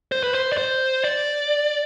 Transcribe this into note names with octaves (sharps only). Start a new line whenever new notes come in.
C5
B4
C5
D5
C5
D5